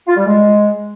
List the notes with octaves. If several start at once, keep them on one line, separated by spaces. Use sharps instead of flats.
F4
G3
G#3